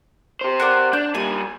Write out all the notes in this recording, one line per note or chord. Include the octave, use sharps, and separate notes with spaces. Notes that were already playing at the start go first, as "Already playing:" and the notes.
G4 C5
F#4 A#4 D5
D4 G6
A#2 G3 G#5